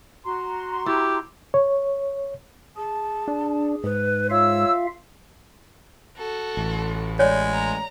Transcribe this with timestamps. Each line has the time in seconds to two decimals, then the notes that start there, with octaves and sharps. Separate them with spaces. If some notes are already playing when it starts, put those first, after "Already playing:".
0.24 F#4 A#5 C6
0.86 E4 G4
1.54 C#5
2.76 G#4 A5
3.28 D4
3.84 G#2 B4
4.30 F4 C#5 E5 F5 E6
6.17 F#4 A4
6.57 A1
7.19 G#3 C#5 D5
7.53 A#5